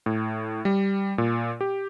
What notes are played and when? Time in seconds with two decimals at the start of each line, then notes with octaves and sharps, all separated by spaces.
0.06 A2
0.65 G3
1.18 A#2
1.61 G4